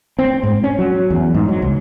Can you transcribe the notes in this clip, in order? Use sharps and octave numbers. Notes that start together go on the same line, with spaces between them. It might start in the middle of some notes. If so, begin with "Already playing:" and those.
C4
G#2
C#4
F#3
E2
G#2
F#3
C#2